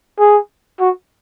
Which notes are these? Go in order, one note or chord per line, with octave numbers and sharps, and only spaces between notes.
G#4
F#4